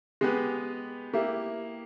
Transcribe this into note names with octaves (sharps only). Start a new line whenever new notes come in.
G#3 B3 G4 B4
A#3 E4 G4